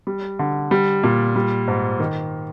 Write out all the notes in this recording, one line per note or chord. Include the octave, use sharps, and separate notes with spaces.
G3
D3
G3
A#2
G3
G#2
D#3